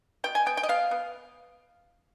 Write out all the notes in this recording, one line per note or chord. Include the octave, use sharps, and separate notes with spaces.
B2 G5
G#5
B3 G5
G5
D#5
B3 F5
B3